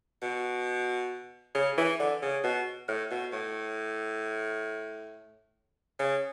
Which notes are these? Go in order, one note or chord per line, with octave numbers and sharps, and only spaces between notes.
B2
C#3
E3
D3
C#3
B2
A2
B2
A2
C#3